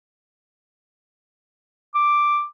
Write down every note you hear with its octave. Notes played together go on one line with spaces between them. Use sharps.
D6